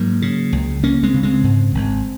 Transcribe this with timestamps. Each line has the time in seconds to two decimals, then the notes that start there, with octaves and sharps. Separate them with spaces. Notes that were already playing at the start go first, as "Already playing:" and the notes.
Already playing: G#2 F#3 A#3
0.22 C#3
0.53 C#2
0.83 C#2 A#3 C#4
1.03 G#3 C4
1.14 C#3
1.23 G#3 C4
1.44 G#2
1.75 G#1